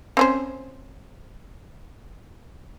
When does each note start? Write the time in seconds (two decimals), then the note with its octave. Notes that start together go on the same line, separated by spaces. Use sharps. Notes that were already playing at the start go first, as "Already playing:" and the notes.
0.17 C4 C#4 C5